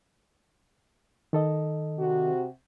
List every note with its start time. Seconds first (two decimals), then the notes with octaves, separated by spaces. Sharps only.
1.33 D#3 A4 D#5
1.98 C3 F#4